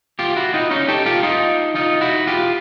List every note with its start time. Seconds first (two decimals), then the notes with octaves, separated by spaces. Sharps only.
0.19 F4 G4
0.36 E4 F#4
0.54 D#4 F4
0.71 C#4 D#4
0.88 G4 A4
1.06 F4 G4
1.23 D#4 F4
1.75 D#4 F4
2.01 E4 F#4
2.27 F4 G4